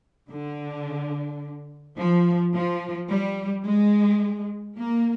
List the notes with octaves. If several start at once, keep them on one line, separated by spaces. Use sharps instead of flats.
D3
F3
F3
G3
G#3
A#3